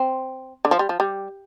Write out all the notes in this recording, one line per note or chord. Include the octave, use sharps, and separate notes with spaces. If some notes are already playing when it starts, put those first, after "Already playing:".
Already playing: C4
D3
F3
G3
F3
G3